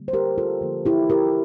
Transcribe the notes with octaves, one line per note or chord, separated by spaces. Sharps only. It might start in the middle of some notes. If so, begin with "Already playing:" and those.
Already playing: D3 G3 A#3
C5
G4 A#4
F4 A4
D3 F3 A#3
E4 G4
G4 A#4